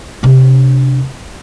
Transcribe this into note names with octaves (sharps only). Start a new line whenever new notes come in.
C3 D4